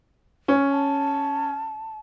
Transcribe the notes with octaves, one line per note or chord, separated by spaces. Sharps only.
C#4
A5